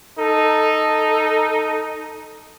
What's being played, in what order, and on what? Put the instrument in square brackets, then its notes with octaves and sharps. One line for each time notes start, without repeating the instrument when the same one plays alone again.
[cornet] D#4 [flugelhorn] A4